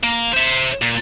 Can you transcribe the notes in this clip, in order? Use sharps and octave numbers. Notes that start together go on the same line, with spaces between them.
A#3
C5 E5
A#2